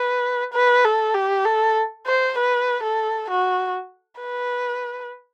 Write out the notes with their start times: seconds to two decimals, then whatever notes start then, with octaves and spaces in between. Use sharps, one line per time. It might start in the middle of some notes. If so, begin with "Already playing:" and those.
Already playing: B4
0.54 B4
0.84 A4
1.15 G4
1.45 A4
2.07 C5
2.38 B4
2.83 A4
3.30 F#4
4.21 B4